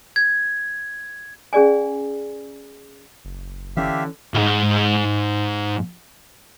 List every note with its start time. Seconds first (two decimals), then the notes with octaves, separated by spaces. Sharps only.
0.16 G#6
1.53 C#4 G#4 D5 G#5
3.25 F#1
3.77 D3 E3 C#4 G4 E5 F5
4.34 B1 G#2